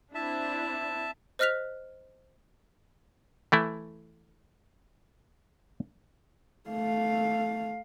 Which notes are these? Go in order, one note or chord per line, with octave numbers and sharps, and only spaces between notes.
C4 D4 E4 E5 A5
C5 D#5 F6 F#6 B6 F7
E3 A3 E4
A3 F5